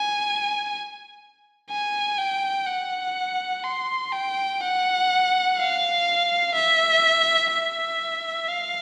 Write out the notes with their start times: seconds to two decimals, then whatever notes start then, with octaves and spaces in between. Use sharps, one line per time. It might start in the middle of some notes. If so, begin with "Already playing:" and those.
Already playing: G#5
1.70 G#5
2.18 G5
2.67 F#5
3.64 C6
4.12 G5
4.61 F#5
5.58 F5
6.54 E5
7.51 E5
8.48 F5